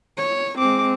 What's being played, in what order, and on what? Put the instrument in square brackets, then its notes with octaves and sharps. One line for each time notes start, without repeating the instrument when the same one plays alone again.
[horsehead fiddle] C#5
[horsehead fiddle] G#3 C4 [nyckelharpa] D6